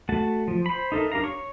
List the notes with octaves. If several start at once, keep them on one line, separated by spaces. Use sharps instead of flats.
A3 F#4 A5
F3
C5 B5
D#4 A4 A#4 E5
D4 G4 A#4 F5 A#5
C#5 C#6